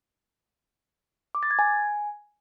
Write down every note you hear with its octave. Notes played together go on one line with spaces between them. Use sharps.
D6
A6
G#6
G#5